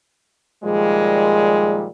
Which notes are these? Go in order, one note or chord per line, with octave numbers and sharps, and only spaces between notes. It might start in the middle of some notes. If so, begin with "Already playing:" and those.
A#2 D#3 F3 G3 G#3